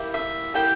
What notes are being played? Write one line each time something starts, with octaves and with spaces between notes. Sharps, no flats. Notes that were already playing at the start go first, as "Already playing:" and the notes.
Already playing: A#3 E4 G4
E5
A#3 E4 G4 G5